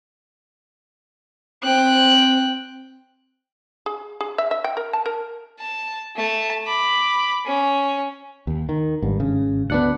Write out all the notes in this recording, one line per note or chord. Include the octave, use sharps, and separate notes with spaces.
C4 G5 F#6
G#4
G#4
E5
E5
G5
A#4
A5
A#4
A5
A3 A5
B5 D6
C#4
D#2
D#3
G#1 G2
C#3
D2 B3 D4 F#5